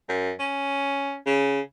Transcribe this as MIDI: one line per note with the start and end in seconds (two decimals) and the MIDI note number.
0.09 0.32 42
0.40 1.16 61
1.26 1.61 49